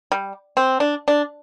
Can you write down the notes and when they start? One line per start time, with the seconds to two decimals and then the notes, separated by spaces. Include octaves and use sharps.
0.12 G3
0.57 C4
0.80 D4
1.08 D4